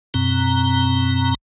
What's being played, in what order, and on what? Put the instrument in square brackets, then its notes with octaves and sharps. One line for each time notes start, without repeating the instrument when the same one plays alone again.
[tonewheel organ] F#2 B2 C4 A#5